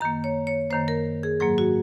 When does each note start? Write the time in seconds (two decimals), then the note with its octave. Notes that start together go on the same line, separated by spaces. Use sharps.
0.01 F#2 D#3 A#3 A#5
0.24 C#5
0.47 C#5
0.70 F#2 D#3 A#3 C5
0.88 A#4
1.23 G#4
1.40 G#2 F#3 A#3 G#4
1.58 F#4